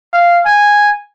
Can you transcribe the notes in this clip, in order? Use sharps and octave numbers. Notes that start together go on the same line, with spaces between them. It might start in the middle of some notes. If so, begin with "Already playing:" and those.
F5
G#5